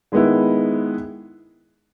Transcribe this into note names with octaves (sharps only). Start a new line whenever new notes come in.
D#3 G#3 B3 E4